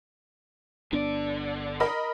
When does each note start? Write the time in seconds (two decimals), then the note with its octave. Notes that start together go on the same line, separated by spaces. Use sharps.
0.92 G1 D3 B3 D4 D5
1.80 A#4 D#5 B5